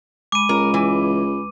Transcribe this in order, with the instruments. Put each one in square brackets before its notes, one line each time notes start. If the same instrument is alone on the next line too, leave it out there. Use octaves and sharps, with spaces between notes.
[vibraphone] G#3 B5 [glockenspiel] D6 D#7
[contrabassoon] C#2 [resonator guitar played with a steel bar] A#4
[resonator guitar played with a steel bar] E3